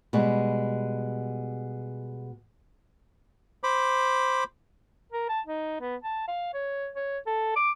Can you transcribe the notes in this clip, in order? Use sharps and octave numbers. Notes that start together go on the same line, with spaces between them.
B2 G3 G#3
C5 B5 D6
A#4
A5
D#4
B3
A5
F5
C#5
C#5
A4
D6